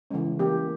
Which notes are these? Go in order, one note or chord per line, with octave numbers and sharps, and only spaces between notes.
C#3 E3 G#3 C#4
E3 A#3 C#4 G4